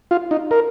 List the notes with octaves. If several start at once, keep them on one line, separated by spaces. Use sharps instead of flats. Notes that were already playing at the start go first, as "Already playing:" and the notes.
F4
D#4
A#4